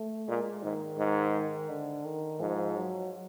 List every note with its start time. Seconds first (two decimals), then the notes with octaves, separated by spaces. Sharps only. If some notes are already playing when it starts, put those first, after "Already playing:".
Already playing: A3
0.28 A#2 G#3
0.63 G#2 D#3
0.98 G#2
1.69 D3
2.05 D#3
2.40 G#2 F3
2.76 F#3